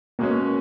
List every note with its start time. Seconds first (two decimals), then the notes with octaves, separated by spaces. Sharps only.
0.19 B2 G#3 A#3 C#4